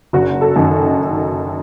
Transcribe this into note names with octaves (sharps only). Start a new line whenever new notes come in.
F#1 F#4
A4
F#2 D#3